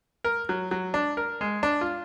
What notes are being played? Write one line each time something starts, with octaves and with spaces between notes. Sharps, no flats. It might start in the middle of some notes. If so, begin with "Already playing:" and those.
A#4
F#3
F#3
D4
A#4
G#3
D4
F4